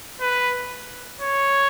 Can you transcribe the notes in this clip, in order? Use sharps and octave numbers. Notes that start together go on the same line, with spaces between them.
B4
C#5